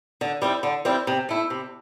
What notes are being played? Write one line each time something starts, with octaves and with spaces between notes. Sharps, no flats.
D3
G3 C4 E4
D3
G3 C4 E4
C3
A3 E4
C3